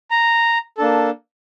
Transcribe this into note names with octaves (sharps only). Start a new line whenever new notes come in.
A#5
A#3 D4 A4